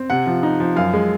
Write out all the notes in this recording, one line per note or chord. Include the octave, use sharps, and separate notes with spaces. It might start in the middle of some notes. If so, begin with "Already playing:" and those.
Already playing: C4
C3 F#5
F3
D#4
F3
F#2 F5
G#3